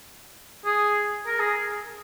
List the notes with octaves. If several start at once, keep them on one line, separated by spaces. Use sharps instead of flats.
G#4
A#4
G#4